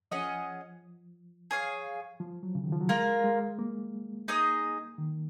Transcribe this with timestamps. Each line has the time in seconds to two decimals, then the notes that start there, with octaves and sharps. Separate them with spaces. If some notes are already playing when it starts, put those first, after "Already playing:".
0.11 F3 C#4 G#4 D#5 F#5
1.51 G#4 C#5 F5
2.20 F3
2.43 F#3
2.55 C#3
2.64 D#3
2.72 F3
2.81 F#3
2.89 G#3 A#3 F4 A#4
3.24 G#3
3.59 A#3
4.28 D#4 G#4 D#5
4.98 D#3